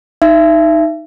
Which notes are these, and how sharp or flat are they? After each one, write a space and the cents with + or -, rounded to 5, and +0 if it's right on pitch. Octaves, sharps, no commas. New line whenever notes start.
D#4 +0 E5 +30